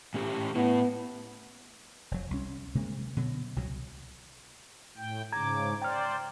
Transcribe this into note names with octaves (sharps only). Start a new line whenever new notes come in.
A2 C#4 G4
A2 B3 E4
F1 F#3
C2 C#4
C3 F#3 G#3 A#3
B2 D3 F#3
C2 B2 F#3
A2 G5
G#2 C#3 A#5 D6 G#6
C5 D5 G5 A#5 F6